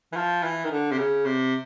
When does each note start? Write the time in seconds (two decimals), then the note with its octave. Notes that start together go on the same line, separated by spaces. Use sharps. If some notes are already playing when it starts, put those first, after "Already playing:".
0.12 E3
0.16 F3
0.43 E3
0.64 D#3
0.71 D3
0.91 C3
0.98 C#3
1.25 C3